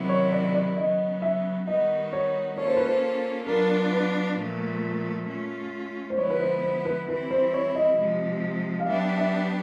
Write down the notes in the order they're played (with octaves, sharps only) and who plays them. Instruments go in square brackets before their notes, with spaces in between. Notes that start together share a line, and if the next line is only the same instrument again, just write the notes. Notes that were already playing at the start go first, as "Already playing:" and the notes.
Already playing: [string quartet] C3 D#3 F#3 B3 E4
[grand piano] C#5
D5
D5
[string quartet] C#3 F#3 B3 [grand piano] D#5
[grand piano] E5
[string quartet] D#3 G3 B3 D#4 F#4 [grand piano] D#5
[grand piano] C#5
[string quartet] A#3 C#4 F4 A4 [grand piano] C#5
[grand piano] C5
B4
C5
[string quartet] F#3 B3 D4 F4 [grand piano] A#4
[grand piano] B4
[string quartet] A#2 F3 A3
A3 C#4 F4
[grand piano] C5
[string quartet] D3 F3 G#3 B3 E4 [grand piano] C#5
[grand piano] B4
C5
C5
B4
[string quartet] E3 G3 C4 E4 [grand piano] B4
[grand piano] C5
C#5
D#5
[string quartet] C3 F3 G#3
[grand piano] F5
[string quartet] F#3 B3 D4 G4 [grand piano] E5
[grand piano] E5